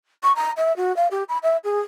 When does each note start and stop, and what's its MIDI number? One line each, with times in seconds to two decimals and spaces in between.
0.23 0.32 85
0.36 0.51 82
0.57 0.75 76
0.76 0.95 66
0.96 1.07 77
1.11 1.23 67
1.28 1.38 83
1.43 1.57 76
1.64 1.79 68